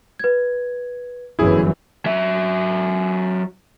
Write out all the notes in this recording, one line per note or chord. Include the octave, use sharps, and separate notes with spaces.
B4 G#6
G1 F#2 E3 E4 G#4
F#3 E5